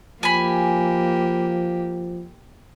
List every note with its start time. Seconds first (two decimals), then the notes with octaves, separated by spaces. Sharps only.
0.23 F3 A#3 G4 G#5 B5